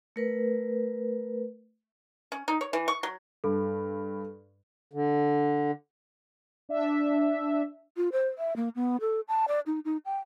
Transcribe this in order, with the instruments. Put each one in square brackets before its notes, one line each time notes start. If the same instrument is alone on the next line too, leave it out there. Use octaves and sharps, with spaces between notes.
[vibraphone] A3 A#4 B4
[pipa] C#4
D#4
C#5
E3
C#6
F#3
[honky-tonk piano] G2 [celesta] A4
[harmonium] D3
[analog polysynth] D4 E5
[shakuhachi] F4
C5
E5
A#3
B3
A4
A5
D5
D#4
D#4
G5